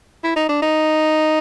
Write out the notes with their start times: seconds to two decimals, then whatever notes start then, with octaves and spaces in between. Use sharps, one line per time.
0.24 E4
0.36 D#4
0.49 D4
0.62 D#4